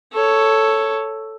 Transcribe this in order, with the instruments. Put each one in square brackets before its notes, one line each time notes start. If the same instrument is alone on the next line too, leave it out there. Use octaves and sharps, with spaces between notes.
[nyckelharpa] A4 C#5